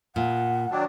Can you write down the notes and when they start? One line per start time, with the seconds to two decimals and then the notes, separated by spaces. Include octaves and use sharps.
0.16 A#2 F#5
0.71 D#3 F#3 D4